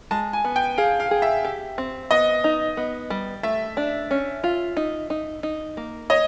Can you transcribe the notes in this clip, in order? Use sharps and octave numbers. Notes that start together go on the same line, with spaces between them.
G#3 A5
G#5
B3
G5
G#4 F5
F5
G#4
E5
G4
C4
B3 D#5
D#4
B3
G3
A3 E5
D4
C#4
F4
D#4
D#4
D#4
A#3
C#5 D#5